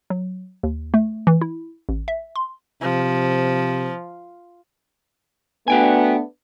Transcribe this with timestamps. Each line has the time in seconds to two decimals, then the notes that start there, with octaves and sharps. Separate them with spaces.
0.10 F#3
0.63 D#2
0.94 A3
1.27 E3
1.41 E4
1.89 A1
2.08 E5
2.36 C6
2.82 C3 F3
5.68 A3 B3 D4 F#4 G5 G#5